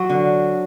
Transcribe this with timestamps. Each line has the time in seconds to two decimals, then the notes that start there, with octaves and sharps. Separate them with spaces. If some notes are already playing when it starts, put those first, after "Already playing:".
Already playing: F#3 F#4
0.10 D3